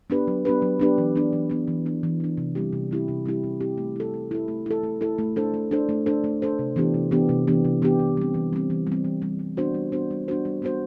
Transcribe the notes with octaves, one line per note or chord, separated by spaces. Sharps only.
B3 D4 G4 B4
F#3
B3 D4 G4 B4
F#3
B3 D4 G4 B4
E3
B3 D4
E3
B3 D4
E3
B3 D4
E3
B3 D4
C3
G3 C4 E4 G4
C3
G3 C4 E4 G4
C3
G3 C4 E4 G4
C3
G3 C4 E4 G4
A3
E4 A4
A3
E4 A4
A3
E4 A4
A3
E4 A4
A3
D4 A4 C5
A3
D4 A4 C5
A3
D4 A4 C5
A3
D4 A4 C5
C3
E3 B3 D4 G4
C3
E3 B3 D4 G4
C3
E3 B3 D4 G4
C3
E3 B3 D4 G4
E3
G3 C4
E3
G3 C4
E3
G3
C4
E3
G3 C4
G3
B3 D4 F#4 C5
G3
B3 D4 F#4 C5
G3
B3 D4 F#4 C5
G3
B3 D4 F#4 C5